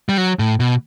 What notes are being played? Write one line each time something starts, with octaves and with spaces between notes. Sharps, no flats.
G3
F#3
A2
B2